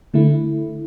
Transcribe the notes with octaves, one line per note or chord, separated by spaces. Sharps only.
D3 A3 E4